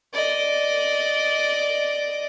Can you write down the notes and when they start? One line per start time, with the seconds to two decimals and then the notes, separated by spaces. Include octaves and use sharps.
0.14 D5 D#5